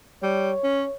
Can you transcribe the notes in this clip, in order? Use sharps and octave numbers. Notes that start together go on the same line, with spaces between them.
G3 C#5
C#4